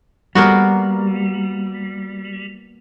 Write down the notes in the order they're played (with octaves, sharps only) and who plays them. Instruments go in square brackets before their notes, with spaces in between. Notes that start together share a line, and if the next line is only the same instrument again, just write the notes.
[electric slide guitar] G3 [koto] A#3 B3 F#4